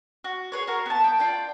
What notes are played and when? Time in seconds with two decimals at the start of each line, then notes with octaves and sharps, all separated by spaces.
0.24 F#4
0.52 G#4 B4 C#5
0.67 F#4 A#4
0.86 B3 A5
1.04 G5
1.19 F4 D5 G5